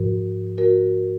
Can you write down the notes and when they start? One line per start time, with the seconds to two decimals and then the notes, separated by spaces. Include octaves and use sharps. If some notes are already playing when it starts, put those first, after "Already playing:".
Already playing: G#2 F3 F#4 A#4
0.58 F#4 A#4